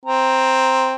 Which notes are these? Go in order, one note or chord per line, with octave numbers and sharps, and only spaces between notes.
C4 A#5